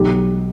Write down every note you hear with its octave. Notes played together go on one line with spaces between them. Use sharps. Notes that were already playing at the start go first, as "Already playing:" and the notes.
Already playing: B1 G4